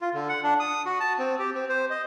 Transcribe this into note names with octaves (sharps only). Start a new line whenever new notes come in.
F4
D3
F#5
D4
D#6
F#4
A5
C4
G4
C4
C5
D#5